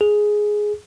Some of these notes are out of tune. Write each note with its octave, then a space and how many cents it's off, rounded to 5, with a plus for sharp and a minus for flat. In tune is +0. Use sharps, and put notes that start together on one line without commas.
G#4 +5